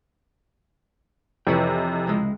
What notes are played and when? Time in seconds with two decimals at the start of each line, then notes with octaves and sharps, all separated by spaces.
1.47 F2 C3 E3 B4 C#5 G5
2.07 C#2 G#3